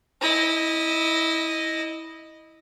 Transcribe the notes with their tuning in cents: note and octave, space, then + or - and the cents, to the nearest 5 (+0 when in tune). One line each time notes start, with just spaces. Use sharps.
E4 -20 D#5 +0